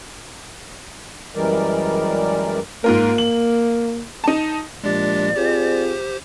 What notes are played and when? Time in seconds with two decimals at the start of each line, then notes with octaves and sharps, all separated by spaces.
1.36 F#2 E3 G3 G#3 A#4 D5
2.84 G#2 A#3 F4 A#4
3.18 F#7
4.24 D#4 A5
4.84 A#2 F3 G#3 D4 G4 D5
5.36 C4 F4 G4 G#4 C5